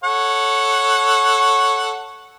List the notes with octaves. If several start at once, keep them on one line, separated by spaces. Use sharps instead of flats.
A4 C#5 F#5